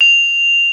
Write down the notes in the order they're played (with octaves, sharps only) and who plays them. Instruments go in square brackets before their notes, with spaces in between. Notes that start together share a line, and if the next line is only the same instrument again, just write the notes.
[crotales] F7